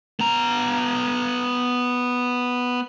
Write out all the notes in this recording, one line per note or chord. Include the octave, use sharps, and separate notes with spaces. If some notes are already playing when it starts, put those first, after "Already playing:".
B3 A#5